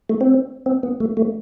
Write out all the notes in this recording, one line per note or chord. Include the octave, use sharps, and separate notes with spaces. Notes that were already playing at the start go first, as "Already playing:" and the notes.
A3
C4
C4
B3
A3
A3